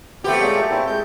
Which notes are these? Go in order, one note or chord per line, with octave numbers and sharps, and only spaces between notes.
A3 B3 C4 G4
A#2 F#3 G#3
A#2 C4 E4
G#3 G6